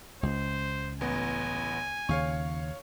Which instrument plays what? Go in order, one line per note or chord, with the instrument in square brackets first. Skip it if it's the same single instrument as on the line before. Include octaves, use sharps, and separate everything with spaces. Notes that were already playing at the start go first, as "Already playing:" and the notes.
[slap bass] C#2 [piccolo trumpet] C5
[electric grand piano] A1 B3 [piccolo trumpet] G#5
[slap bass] D#2 C#3 [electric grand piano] C#5 F5 C#6